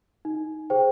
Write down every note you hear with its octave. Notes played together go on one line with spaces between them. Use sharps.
D#4
G#4 C5 G5